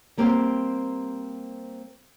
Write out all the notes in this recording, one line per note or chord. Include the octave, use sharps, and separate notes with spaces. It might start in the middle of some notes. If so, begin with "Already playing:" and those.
G3 A#3 C4 G4 C5